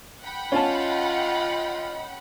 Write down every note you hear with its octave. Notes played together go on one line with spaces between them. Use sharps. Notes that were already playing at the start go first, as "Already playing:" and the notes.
F#5 G5 B5
C#4 F4 D#5 A5